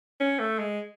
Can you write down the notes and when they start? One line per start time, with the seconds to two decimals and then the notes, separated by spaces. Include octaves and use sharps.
0.20 C#4
0.39 A3
0.59 G#3